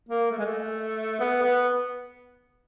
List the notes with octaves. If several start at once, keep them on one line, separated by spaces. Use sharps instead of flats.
A#3
A3
G#3
A3
B3
B3